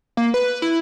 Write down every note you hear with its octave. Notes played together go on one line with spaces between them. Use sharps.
A#3
B4
E4